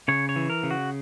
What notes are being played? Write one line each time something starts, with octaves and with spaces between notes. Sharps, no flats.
C#3 C#5
C#5
E3
A#4
C#3
F#4